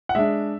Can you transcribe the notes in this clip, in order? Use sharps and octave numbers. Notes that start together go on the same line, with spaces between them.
F#5
G#3 D4 E5